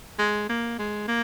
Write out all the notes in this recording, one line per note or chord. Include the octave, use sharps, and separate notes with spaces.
G#3
A#3
G#3
A#3